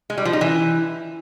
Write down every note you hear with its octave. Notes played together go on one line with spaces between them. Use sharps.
G#3
G3
F3
D#4
E3